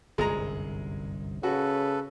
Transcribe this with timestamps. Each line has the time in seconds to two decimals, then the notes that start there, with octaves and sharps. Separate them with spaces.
0.18 G1 C2 F#2 G#3 A#5
1.43 C#3 F#4 A4 B4